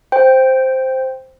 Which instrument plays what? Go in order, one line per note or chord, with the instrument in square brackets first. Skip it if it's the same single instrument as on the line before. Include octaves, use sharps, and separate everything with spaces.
[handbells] C5 G5